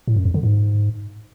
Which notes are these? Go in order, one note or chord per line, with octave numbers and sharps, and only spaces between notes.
A2
F#2
F2
D3
G#2